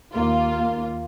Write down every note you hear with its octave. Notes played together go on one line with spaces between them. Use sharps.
D#2 A#3 F4